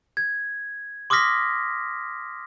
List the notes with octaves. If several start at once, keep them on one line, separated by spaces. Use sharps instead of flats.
G#6
C6 D6 D#6 F6 A#6 B6